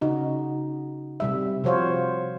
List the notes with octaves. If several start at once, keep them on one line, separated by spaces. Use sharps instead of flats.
C#3 D#4 F#4
C3 G3 E5
C3 F3 F#4 C5 C#5 F5